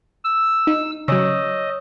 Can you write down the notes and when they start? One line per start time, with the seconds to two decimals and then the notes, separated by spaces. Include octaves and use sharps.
0.24 E6
0.67 D#4
1.08 C#3 F#3 C#5 D#5 E6